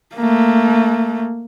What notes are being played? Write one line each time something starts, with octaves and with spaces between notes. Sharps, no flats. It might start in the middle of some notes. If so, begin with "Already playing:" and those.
A3 A#3